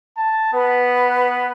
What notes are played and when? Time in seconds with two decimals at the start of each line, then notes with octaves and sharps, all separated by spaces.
0.17 A5
0.53 B3 B4